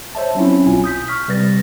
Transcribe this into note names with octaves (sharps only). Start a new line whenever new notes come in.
C5 C#5 E5 A5
F#3 C4 C#4 E4
B1 F4 G#5
D#6 G6 B6
C#6 F6 B6
C3 G3 B4 A6 A#6